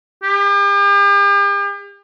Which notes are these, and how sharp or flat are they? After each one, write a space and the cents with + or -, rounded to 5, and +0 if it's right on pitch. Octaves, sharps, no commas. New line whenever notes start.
G4 +40